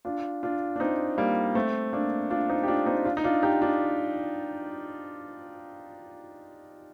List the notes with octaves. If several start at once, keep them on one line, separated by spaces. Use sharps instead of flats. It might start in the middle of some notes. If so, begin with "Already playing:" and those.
D4 F4
D4 F4
D4
C4 D#4
G3 A#3
A3 C4
A#3 D4
D4 F4
C4 D#4
G4
D4 F4
C4 D#4
D4 F4
D#4
D4 F4
D#4 G4
D4 F4